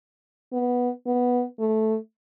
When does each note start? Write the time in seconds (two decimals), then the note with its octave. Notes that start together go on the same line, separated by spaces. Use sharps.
0.52 B3
1.07 B3
1.59 A3